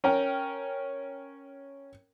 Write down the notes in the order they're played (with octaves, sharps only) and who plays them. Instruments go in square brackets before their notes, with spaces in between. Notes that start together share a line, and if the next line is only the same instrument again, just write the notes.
[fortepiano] C#4 A#4 G5